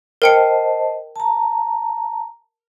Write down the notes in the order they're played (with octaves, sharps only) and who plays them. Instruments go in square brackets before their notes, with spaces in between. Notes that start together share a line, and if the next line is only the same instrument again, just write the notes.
[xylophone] A#4 G5 C#7 [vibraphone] C5 D#5 A5
[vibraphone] A5 A#5